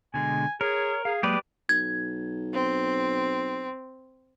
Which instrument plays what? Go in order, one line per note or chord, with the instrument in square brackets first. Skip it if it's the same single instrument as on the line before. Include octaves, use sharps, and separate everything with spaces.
[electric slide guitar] B2 D3 G#3 [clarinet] G#5
[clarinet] G#4 [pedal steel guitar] A#4 [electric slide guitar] C#5
[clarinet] G#4 [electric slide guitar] F5
[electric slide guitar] F#3 G#3 A#3 [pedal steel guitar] G4 B4 D5 [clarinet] D#6
[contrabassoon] B1 [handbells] G#6
[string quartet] C4